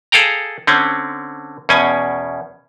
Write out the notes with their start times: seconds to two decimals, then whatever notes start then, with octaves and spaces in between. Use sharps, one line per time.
0.12 G#4 A4 F5 G5 A#5
0.67 D3 C4 C#4
1.69 E2 B2 C#4 G#5